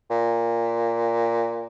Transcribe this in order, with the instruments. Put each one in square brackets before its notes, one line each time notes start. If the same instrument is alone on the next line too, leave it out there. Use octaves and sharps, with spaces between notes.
[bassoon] A#2